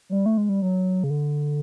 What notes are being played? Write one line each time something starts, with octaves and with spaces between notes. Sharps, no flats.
F#3
G3
A3
G#3
G3
F#3
C#3
D3